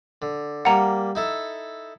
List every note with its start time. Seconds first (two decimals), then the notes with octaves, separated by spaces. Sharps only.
0.22 D3
0.65 G3 A#3 F#5 A#5
1.15 D#4 E4 A4